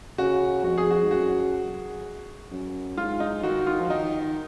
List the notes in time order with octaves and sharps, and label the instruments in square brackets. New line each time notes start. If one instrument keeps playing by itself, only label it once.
[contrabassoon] C#3 [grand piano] F#4
[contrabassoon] F2 [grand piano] F#4
[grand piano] G#4
F#4
[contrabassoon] G#2
[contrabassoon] F#2 [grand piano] F#4
[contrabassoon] F#2
[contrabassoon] G#2 [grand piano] F4
[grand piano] D#4
[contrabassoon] D#3 [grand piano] F#4
[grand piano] F4
[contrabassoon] F3
[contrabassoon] D#3 [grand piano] D#4